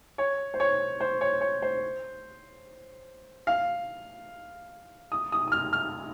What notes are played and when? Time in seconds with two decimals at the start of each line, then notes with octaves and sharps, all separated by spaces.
0.18 C#5
0.54 C5
0.60 C#5
1.00 C5
1.21 C#5
1.41 C#5
1.62 C5
3.47 F5
5.12 D#6
5.32 D#6
5.48 D#6
5.52 F6
5.73 F6